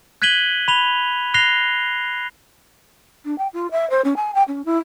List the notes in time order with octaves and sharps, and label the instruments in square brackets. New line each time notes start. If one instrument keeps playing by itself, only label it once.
[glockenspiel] F#6 G#6 B6 D#7 F#7 G7
B5 F7 G7
F#6 A#6 C7 F7 G7
[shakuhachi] D4
G5
F4
E5
C5
C#4
G#5
G5
C#4
E4